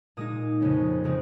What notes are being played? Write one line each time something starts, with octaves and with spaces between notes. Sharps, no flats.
A#2 G#3 D#4 D#6
F2 C#3 G#3 C#4
C#3 F3 G#3 C4